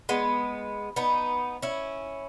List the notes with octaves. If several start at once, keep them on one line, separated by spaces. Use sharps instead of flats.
G#3 B3
B3 D#4
C#4 E4